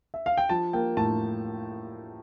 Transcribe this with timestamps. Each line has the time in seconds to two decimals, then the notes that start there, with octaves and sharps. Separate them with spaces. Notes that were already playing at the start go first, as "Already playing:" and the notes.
0.14 E5
0.26 F5
0.37 G5
0.49 F3 A5
0.73 A#3 G5
0.97 A2 A5